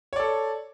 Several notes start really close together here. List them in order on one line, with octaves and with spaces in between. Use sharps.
C#5 D5 A4